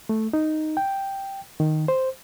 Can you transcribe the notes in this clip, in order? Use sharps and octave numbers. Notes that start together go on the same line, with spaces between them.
A3
D#4
G5
D#3
C5